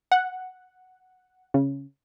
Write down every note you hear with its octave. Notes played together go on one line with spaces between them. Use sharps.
F#5
C#3